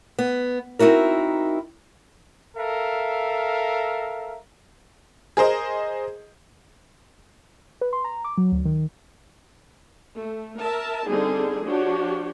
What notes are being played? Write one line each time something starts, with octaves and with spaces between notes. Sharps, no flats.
B3
C4 D#4 E4 F#4 A#4
A4 A#4 E5 F5
G#4 A#4 C5 D#5
B4
C6
A#5
D6
F#3
D2
D#3
A3
A#4 E5 A5
D3 G3 C4 D#4 G#4
F3 D4 F#4 G4 C#5